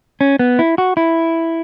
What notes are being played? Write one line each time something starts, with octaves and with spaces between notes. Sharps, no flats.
C#4
B3
E4
F#4
E4